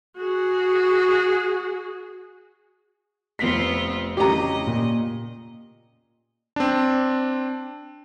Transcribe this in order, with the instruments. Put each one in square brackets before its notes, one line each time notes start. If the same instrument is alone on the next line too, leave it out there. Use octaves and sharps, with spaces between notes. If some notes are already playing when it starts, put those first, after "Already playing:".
[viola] F#4 G#4
[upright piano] F1 B6 [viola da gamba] B3 C4 F4
[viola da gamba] C#3 D#5 [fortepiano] G4 A#5
[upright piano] A#2
[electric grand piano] C4 D4